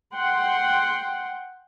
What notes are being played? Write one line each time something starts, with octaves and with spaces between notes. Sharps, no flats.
F#5 G5 C6